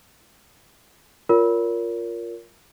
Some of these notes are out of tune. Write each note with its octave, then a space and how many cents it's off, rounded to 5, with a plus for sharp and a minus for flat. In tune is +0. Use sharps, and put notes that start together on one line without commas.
F4 +0 A#4 +0 C#5 +35